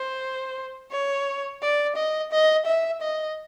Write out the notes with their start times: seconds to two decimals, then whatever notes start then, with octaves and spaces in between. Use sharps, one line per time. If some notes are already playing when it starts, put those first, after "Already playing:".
Already playing: C5
0.92 C#5
1.62 D5
1.96 D#5
2.32 D#5
2.66 E5
3.01 D#5